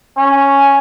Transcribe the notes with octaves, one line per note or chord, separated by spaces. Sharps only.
C#4